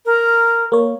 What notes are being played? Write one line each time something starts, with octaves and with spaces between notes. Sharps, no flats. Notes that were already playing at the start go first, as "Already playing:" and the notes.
A#4
A#3 C#5